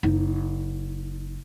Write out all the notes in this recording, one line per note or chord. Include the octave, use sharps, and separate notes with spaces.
F#1 D#4